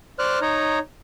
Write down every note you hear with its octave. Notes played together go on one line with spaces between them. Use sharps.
C5 D5 F6 F#6
D#4 C#5 A#5